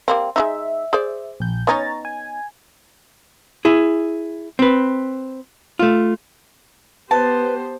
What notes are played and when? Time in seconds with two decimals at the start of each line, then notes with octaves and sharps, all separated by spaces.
0.08 G3 A#3 C4
0.36 G#3 D4 D#4 E5
0.93 G#4 C5 D5
1.40 A#1 G6
1.67 B3 C#4 D#4 C#5 A#5 A6
2.05 G#5
3.65 E4 G#4
4.59 C4 B4
5.79 A3 F4
7.11 B3 G4 B4 C5 A5